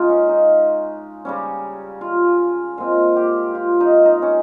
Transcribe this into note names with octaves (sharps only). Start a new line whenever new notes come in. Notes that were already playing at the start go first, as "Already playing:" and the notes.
Already playing: C#3 G#3 D#4 F4
C#4
D#4
C#3 G3 C#4
F4
A#2 G#3 C4 F4
G4
F4
D#4
D#4
C#4